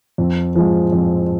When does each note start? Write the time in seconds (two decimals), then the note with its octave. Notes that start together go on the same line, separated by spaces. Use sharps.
0.18 F2
0.55 F3 G#3
0.92 F2